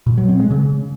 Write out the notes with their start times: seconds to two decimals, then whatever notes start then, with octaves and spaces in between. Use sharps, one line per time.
0.07 A#2
0.18 F#3
0.29 C4
0.40 G#3
0.51 C#3